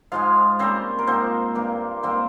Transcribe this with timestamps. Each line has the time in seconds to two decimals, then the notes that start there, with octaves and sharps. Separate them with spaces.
0.12 G#2 F3 G#3 F4 F5
0.59 C#3 G3 A#3 C4 C5
0.99 A#4
1.07 G#2 F3 A#3 C4 C5
1.55 G2 G3 A#3
2.03 G#2 G3 A#3 C4 C5